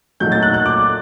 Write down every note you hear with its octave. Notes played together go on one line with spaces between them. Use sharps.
A#2 F#3 A3 D#4 G6
A6
F#6
F#6
D6